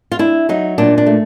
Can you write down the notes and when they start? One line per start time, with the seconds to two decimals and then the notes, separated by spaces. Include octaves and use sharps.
0.12 F4
0.19 D4 E4
0.49 F#3 D#4
0.78 A#2 D4
0.98 D4
1.06 A3